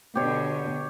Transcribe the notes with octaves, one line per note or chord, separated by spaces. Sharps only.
B2 D3 G4 C#5